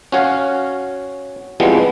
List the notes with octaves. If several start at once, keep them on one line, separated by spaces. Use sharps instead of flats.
C#4 F#4 C#5 F5
E3 F3 G3 G#3 B3 C4